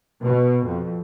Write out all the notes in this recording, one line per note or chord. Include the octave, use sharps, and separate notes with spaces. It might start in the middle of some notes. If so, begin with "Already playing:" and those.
B2
F2